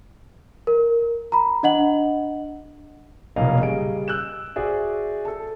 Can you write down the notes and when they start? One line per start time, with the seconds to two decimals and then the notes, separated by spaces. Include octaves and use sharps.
0.67 A#4
1.32 A#5 B5
1.63 D4 D#5 F#5 F#7
3.36 F1 B1 A#2 A#3 D#5 F5
3.59 C#3 G3 D#5 D7
4.08 E6 F#6 G6 E7
4.56 F#4 G#4 C5 D5 E5
5.25 A4 A5